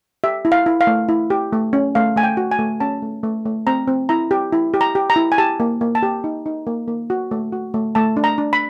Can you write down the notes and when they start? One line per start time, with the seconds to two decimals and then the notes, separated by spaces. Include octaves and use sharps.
0.24 G4 E5
0.45 E4
0.52 F5
0.66 E4
0.81 F5
0.87 A3
1.09 E4
1.30 G4
1.53 A3
1.73 C#4
1.95 A3 F5
2.16 A3 G#5
2.23 G5
2.37 F#4
2.51 G#5
2.59 A3
2.80 C#4 A5
3.02 A3
3.23 A3
3.46 A3
3.67 C4 A#5
3.88 C4
4.09 E4 A#5
4.31 G4
4.53 E4
4.74 G4
4.81 A#5
4.95 G4
5.10 A#5
5.16 E4
5.32 G#5
5.38 G4 A5
5.60 A#3
5.81 A#3
5.95 A5
6.03 G4
6.24 D#4
6.46 D#4
6.67 A#3
6.88 A#3
7.10 F#4
7.31 A3
7.52 F#4
7.74 A3
7.95 A3 A5
8.17 D4
8.24 A#5
8.38 D4
8.53 B5